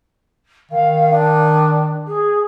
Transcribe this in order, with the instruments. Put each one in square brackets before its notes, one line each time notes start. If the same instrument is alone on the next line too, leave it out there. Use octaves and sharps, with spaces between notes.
[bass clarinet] D#3 [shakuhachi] F5
[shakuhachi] D4
G#4